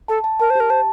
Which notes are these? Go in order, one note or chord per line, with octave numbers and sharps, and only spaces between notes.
A4 A5
A5
A#4 A5
C5
G4 A#4
C5 A5